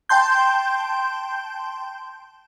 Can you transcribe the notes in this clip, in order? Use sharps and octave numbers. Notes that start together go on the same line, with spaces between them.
G5 A5 C6 G6